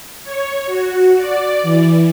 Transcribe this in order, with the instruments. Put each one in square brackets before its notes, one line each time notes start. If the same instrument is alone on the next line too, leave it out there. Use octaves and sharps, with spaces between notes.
[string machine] C#5
F#4
D5
E3